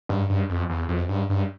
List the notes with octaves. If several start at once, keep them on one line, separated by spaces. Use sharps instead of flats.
G2
G2
F2
E2
F2
G2
G2